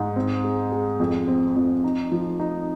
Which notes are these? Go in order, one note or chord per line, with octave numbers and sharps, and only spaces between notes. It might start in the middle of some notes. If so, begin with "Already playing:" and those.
Already playing: G#2
C4
G#3
G#3
F2
C4
F2
D#4
F3
D#4